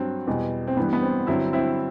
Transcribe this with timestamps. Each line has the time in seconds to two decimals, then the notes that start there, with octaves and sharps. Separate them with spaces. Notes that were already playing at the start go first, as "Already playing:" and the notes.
Already playing: G2 F#3 C4
0.27 E2 B2 G3
0.67 C4
0.77 G2 E3 G3 B3
0.93 B3
1.02 C4
1.27 G2 D3 F#3 C4 E4
1.53 C4 E4